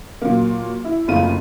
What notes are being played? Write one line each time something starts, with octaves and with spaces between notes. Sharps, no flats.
A#2 F#3 A#3
E4
F#1 F2 A3 F4 D#7